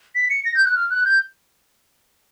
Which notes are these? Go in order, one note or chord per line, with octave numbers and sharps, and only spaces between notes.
B6
C#7
A#6
G6
F#6
F6
F#6
G6